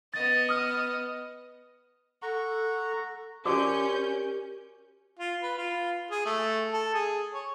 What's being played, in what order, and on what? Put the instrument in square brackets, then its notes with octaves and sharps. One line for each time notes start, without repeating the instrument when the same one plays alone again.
[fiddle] B3 D#5 [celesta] A6
[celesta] D#6 F6
[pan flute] A4 [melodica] F#5 A#5 C#6
[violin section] C#4 G6 [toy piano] F#4 C5 D5 [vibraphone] G4 A#4 [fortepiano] D6
[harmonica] F4
B4
F4
G#4
A3
A4
G#4
C#5